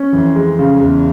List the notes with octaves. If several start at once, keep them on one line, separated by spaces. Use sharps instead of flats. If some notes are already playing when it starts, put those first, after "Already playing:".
Already playing: C#4
F2 E3
G#3
C#3
E2 G#3